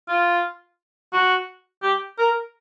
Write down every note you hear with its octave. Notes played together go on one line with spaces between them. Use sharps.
F4
F#4
G4
A#4